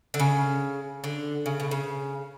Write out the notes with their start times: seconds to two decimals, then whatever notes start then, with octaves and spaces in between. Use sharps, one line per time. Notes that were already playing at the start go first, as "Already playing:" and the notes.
0.14 D3
0.19 C#3
1.04 D3
1.46 C#3
1.60 B2
1.71 C#3